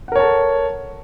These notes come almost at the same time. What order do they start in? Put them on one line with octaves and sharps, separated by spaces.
F#5 A#4 C#5 A5 A4